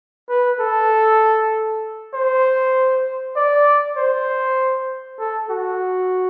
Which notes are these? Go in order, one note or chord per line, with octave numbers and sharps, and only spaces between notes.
B4
A4
C5
D5
C5
A4
F#4